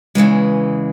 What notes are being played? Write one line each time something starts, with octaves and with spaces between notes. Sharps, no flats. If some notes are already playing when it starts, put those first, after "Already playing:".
E2 C#3 E3 G#3